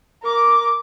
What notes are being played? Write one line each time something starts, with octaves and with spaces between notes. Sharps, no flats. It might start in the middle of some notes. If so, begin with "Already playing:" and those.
A#4 D6